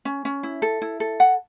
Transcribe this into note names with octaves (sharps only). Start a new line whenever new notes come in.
C#4
C#4
E4
A4
E4
A4
F#5